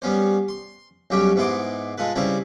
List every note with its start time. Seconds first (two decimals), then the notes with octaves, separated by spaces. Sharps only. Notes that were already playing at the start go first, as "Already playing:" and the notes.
0.02 G3 B3 C#4 C5
0.48 C6
1.10 B1 F#3 G3 C#4 G4 G5
1.36 G#2 B3 E4 C6 D6
1.98 G#3 F4 A4 B4
2.15 C#3 G3 C4 E4 B4 C5